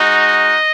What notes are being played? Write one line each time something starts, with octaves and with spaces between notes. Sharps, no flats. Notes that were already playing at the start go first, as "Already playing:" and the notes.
Already playing: G#3 D#4 F#4 D#5